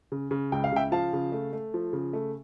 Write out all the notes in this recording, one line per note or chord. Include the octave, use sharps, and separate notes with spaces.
C#3
C#3
C#2 G5
F5
C#3 E5 G5
F3 F5 A5
C#3
A3
A3
F3
C#3
A3